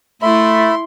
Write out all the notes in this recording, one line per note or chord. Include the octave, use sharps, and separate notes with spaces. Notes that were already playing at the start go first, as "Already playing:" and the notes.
A3 E4 E5 B5 C6